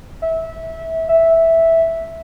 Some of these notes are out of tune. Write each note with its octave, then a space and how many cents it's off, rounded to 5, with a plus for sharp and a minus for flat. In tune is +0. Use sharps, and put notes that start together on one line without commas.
E5 -20
E5 -5